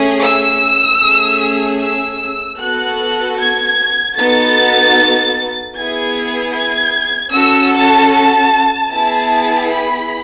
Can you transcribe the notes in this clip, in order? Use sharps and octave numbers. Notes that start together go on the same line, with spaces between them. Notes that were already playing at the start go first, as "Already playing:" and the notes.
Already playing: A3 C#4 G#4
E6
A3 C#4 G#4
E6
B3 F#4 A4 F#6
G#6
B3 D#4 F#4 A4 A6
B3 E4 G#4 G#6
G#6
C#4 F#4 A4 E6
A5
A5
B3 E4 G#4 A5
B5